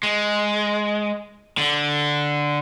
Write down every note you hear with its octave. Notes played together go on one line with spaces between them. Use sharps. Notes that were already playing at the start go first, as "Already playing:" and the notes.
G#3
D3